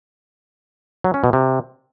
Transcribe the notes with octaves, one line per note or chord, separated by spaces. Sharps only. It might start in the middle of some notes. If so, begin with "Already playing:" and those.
F#3
C#4
B2
C3